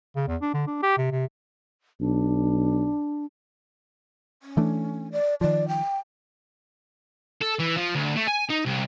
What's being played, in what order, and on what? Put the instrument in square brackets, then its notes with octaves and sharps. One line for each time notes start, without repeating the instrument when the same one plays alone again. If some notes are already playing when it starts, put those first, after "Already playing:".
[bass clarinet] C#3
E2
D4
D3
D4
G4
C3
C3
[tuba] B1 [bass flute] D4
[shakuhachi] C#4
[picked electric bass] E3 A3 D4
[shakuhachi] D5
[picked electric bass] D#3 F3 [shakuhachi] D5
[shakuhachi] G5
[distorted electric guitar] A4
E3
F3
D2
A3
G#5
D#4
C2